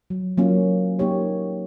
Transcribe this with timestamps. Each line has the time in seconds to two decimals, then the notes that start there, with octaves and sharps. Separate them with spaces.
0.10 F#3
0.37 F#3 A#3 C#4 F4
0.99 A#3 D#4 G4 C#5